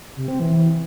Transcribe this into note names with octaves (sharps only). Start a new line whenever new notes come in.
C3
C4
E3